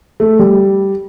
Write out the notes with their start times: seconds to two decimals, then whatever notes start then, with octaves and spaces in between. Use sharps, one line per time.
0.20 A3
0.39 G3